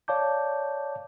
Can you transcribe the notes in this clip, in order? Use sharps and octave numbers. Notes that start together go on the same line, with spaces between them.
C#5 D5 F5 A5 D6 G6